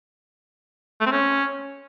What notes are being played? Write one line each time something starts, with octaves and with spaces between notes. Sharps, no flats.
A3
C4
C#4